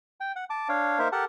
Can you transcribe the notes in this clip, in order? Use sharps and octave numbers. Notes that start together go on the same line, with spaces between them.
G5
F#5
A5 D6
D4 C#5 F5
A#3 D#4 A#4 C5 E5
G4 A4 A#4 F#5 A5